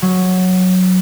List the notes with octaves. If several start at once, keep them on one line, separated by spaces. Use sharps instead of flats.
F#3